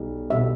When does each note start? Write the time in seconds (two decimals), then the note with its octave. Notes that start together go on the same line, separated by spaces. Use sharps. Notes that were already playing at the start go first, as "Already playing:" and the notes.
Already playing: B1 B2 G3
0.30 B2 G3 E5